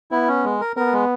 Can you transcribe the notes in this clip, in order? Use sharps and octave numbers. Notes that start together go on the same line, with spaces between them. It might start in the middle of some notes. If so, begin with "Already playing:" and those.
B3 E4
C#4
G#3
A#4
B3 A#4
G#3